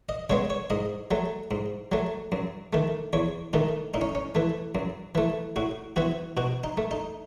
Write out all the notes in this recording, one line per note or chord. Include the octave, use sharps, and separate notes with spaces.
D#5
C#3 G#3 B3 C#5
C#5
G#2 D#5
F#3 A3
G#2
F#3 A3
F#2
D#3 A3
E2 C#5
D#3 A3 D#4
A2 D#4
C#4
C#4
E3 A3
F#2
E3 A3
A2 F#4
E3 B3 F#4
B2 F#4
D#4
A3
D#4